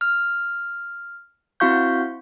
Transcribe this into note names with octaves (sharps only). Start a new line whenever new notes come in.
F6
C4 E4 F#4 F5 C#6 G6